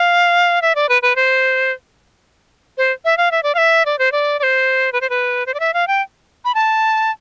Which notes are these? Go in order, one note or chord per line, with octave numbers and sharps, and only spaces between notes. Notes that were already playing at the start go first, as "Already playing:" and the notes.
Already playing: F5
E5
D5
B4
B4
C5
C5
E5
F5
E5
D5
F5
E5
D5
C5
D5
D5
C5
B4
C5
B4
C5
D5
E5
F5
G5
B5
A5